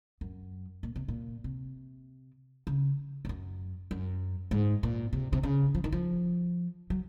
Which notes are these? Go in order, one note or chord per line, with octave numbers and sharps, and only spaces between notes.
F#2
A#2
C3
A#2
C3
C#3
G#2
F#2
F#2
G#2
A#2
C3
C3
C#3
F3
D#3
F3
F#3